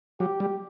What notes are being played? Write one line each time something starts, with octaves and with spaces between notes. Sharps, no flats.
F#3 G4
G3